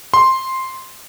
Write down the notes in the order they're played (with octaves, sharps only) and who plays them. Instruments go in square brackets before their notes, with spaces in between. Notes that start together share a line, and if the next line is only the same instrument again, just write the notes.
[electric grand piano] C6